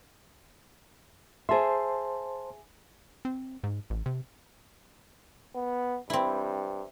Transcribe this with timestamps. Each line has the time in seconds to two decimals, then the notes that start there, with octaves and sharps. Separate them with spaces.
1.49 G#4 C5 E5 A5 C6
3.25 C4
3.64 G#2
3.90 A1
4.06 C3
5.55 B3
6.10 G2 C4 E4